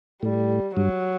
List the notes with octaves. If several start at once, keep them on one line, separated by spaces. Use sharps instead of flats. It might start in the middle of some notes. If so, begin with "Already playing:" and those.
A2 G3
G2 F#3